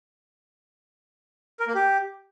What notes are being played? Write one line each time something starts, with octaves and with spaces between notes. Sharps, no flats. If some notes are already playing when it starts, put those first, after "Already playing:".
A#4
A#3
G4